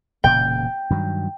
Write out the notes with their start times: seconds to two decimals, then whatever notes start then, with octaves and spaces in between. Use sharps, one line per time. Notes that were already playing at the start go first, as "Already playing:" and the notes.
0.24 E1 A#2 C#3 G5
0.90 G2 D#3 F#3